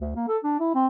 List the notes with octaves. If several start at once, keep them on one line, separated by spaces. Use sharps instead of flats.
D2
A#3
A4
D4
E4
C4